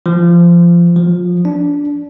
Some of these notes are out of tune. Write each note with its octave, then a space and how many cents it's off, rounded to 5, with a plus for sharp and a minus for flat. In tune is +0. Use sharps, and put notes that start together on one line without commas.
F3 -20
F3 +20
D4 -15